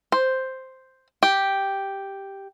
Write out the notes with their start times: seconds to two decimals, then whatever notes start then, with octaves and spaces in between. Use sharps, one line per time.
0.12 C5
1.23 G4